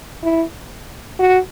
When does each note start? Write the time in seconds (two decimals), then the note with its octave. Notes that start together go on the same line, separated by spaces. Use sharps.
0.23 E4
1.19 F#4